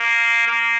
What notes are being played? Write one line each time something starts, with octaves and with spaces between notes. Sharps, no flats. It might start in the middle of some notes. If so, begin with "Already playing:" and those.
Already playing: A#3
A#3